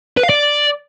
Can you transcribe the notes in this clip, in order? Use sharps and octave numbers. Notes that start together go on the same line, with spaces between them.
B4
F5
D5